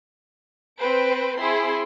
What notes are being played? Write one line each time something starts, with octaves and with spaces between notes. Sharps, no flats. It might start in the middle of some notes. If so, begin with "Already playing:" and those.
C4 B4 C5 D7
C4 E4 G#4 C6 C7